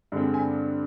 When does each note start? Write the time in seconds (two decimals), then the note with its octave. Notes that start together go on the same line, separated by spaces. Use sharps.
0.12 G2 D3 G#3 C4
0.34 G#5